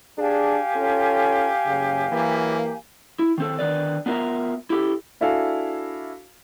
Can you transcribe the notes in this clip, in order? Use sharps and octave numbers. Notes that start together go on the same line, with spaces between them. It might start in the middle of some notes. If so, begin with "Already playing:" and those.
D4 G4 G#4 F5 G#5
C#4 F4 A4
F#1 F#2 C#3
E3 F#3 A#3
E4
D#3 C4 A4
D3 D#3 B4 D5
B3 D4 F4 A#4 E5 A#5
E4 G4 A4
D4 E4 F#4 A4 F5 G#5